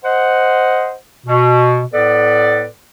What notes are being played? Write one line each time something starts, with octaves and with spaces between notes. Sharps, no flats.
C5 D#5 F#5
B2
A2 B3 A4 B4 D5